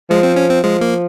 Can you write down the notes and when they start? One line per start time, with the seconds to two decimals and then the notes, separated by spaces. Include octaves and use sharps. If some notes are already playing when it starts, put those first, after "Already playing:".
0.10 F3 G#3
0.23 C4
0.36 C#4
0.50 C4
0.63 F3 G#3
0.81 A#3